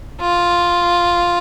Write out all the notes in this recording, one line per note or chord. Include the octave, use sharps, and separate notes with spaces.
F4